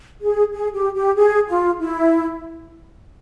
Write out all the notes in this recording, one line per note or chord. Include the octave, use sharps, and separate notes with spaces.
G#4
G#4
G4
G4
G#4
F4
E4